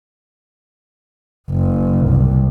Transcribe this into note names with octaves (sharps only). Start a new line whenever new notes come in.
F#1
C2